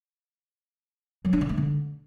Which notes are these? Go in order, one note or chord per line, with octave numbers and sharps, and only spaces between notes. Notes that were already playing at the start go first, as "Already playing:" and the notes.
F#3
D4
D3
A3
D3